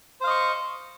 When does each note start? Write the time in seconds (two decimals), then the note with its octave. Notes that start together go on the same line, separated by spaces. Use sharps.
0.21 C5
0.24 F5
0.27 D#5
0.30 C#6